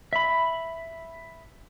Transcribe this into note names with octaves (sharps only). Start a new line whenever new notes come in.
E5 B5